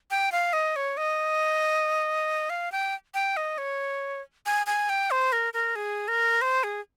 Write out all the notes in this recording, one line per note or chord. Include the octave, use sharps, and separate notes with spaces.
G5
F5
D#5
C#5
D#5
F5
G5
G5
D#5
C#5
G#5
G#5
G5
C5
A#4
A#4
G#4
A#4
C5
G#4